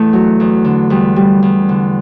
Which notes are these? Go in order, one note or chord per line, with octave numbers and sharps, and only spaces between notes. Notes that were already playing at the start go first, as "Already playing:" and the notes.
Already playing: E2 A3 E4
F#3
E2
D3
E2 G3
G3
E2
D3